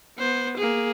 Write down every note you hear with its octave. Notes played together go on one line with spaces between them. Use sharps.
B3 C5
A#3 G#4